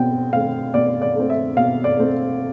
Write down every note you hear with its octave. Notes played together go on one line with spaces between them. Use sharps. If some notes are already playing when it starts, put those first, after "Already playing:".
Already playing: B2 C4 G5
A3 C4 F5
B2 D5
D5
A3 C4
E5
B2 F5
D5
A3 C4